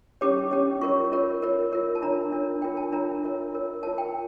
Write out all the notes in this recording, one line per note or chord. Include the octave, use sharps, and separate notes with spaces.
C#4 G4 C#5 D6
C#4 G4 C#5
F4 A#4 C#5 C#6
F4 A#4 C#5
F4 A#4 C#5
F4 A#4 C#5
A5
D4 F4 A#4 C#5 A#5
D4 F4 A#4 C#5
D4 F4 A#4 C#5 G5
A5
D4 F4 A#4 C#5 A#5
F4 A#4 C#5
F4 A#4 C#5
F4 A#4 C#5 A5
G5